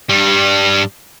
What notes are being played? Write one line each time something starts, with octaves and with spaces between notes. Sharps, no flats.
G2 G3